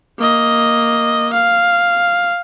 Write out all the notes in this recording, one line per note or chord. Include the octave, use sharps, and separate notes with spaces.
A#3 D#5
F5